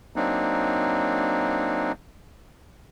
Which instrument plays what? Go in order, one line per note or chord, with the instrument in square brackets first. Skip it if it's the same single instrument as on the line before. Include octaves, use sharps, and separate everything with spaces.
[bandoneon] F#3 A#3 C4 D4 D#4